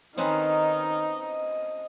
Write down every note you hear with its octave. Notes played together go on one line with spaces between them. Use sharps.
D#3 C4 C#4 D#4 B4
D#5